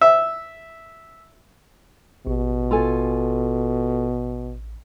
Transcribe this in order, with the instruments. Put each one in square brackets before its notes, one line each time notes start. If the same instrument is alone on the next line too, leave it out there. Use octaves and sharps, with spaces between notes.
[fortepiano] E5
[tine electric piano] A1 [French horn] B2
[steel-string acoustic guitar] F4 A4 G#5